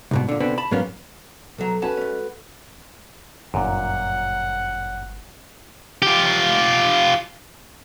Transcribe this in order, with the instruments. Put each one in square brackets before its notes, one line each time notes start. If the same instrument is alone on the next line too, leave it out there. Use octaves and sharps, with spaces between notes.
[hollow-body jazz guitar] C2 G#2 B2
A#2 D3
B2 D3 B3 C4
A5 B5
G#2 F#3 A#3 B3 C#4
[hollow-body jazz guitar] B1 F#3 A#5 [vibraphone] A4
[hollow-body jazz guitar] C#4 A5 [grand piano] F#4 B4
[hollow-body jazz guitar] G#3 C#4
[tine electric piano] G1 [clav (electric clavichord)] F#2 A#2 [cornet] F#5
[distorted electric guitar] F4 G4